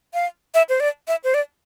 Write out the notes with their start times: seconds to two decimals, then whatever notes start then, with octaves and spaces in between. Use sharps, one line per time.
0.14 F5
0.54 E5
0.69 C5
0.80 D5
1.08 E5
1.24 C5
1.34 D5